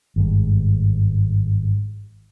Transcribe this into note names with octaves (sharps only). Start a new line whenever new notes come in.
G#1 G2 G#3